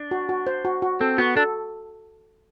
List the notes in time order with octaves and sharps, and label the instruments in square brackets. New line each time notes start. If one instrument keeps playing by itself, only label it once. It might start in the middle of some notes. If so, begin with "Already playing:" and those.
Already playing: [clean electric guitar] D4
[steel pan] F#4
F#4
C5
F#4
F#4
[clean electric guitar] C4 [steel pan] A4
[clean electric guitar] B3 [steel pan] F#4
[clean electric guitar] D4 [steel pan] A4